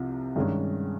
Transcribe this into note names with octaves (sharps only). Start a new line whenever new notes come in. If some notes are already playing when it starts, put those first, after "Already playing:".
Already playing: C2 C3 F3
G2 D#3 G#3 C#4